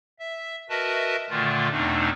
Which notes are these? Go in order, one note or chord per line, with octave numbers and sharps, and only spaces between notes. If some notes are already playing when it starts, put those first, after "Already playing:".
E5
F#4 A#4 B4 D#5 E5 A5
A#2 D3 D#3 A3 F4
E2 B2 A3 C4 D4 D#4